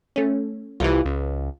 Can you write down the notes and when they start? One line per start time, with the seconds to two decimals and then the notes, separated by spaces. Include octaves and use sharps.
0.16 A3 C#4
0.80 C2 C3 E3 F4
1.05 C#2